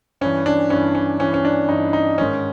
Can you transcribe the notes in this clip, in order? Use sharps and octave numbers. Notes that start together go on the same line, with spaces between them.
G2 E3 C#4
D4
G2 E3 C#4
C#4
G2 E3 C#4
C#4
D4
G2 E3 D#4
D#4
G#2 D#3 C#4